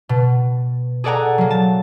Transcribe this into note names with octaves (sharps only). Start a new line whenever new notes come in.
B2
G#4 A4 D5 F#5 G#5 A#5
F#3 A#3
A5